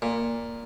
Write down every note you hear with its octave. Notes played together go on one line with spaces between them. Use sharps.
A#2